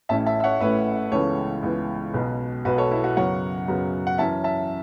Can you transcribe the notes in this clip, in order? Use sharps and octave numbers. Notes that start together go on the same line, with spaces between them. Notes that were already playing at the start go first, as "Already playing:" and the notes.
A1 A2 A3 C#4 E5 A5
E5 A5
E5
C#5 F#5
A1 A2 A3 C#4 B4 E5
C#2 C#3 E3 B3 A4 C#5
C#2 C#3 E3 B3
B1 B2 B3
B1 B2 B3 F#4 B4
A4 C#5
E4
F#4
F#2 C#3 F#3 B3 C#5 F#5
F#2 C#3 F#3 B3
F#5
F#2 E3 C#4 E5 A5
E5 A5